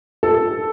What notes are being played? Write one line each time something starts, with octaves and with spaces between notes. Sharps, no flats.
A4